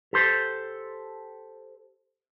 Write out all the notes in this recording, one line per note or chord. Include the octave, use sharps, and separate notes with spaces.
G4 A4 C5